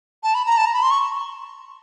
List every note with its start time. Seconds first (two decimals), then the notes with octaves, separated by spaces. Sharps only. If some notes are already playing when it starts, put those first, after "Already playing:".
0.23 A5
0.35 B5
0.46 A#5
0.57 A5
0.66 A#5
0.74 B5
0.83 C6
0.91 C#6